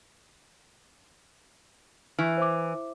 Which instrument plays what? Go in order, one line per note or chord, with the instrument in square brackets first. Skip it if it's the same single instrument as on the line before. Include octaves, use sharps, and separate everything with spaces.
[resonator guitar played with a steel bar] E3 [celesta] F6
[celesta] C5 E5 D6